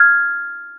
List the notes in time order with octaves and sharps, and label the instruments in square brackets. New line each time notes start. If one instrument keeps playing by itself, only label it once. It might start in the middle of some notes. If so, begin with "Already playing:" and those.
Already playing: [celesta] F6 G#6